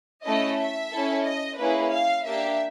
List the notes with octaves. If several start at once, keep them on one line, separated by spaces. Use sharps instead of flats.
A3 C#4 E4 A4 D#5
E5
C#4 E4 A4
D#5
A#3 C#4 E4 G#4 B4
F5
A#3 D4 G4 E5